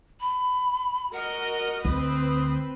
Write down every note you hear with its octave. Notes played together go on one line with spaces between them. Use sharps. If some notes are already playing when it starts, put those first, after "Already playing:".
B5
F#4 A#4 D#5 F#5
D2 C4 B4 D#6